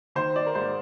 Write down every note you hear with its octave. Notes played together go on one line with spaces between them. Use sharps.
D#3 C5
D5
A#4
G#2 C5